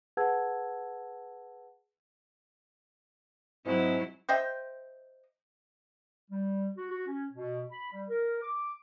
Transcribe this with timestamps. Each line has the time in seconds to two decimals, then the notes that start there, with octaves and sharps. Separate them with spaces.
0.17 G#4 B4 F#5 A5 E6 G#6
3.66 G#2 F#3 C4 E4
4.29 C5 D#5 E5 G5
6.31 G3
6.77 F#4
6.91 F#4
7.07 C#4
7.33 B2
7.71 B5
7.92 G3
8.09 A#4
8.42 D6